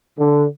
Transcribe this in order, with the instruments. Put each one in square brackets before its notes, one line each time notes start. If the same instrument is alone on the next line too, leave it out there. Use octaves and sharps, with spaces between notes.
[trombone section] D3